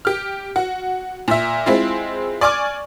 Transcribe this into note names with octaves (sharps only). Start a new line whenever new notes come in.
G4 F6
F#4
A#2 E5
G#3 C4 E4 F4
D5 G#5 C#6 D6 F6